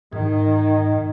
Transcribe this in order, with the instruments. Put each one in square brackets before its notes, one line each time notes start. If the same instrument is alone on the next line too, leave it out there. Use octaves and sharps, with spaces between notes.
[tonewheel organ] G#2 [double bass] D#3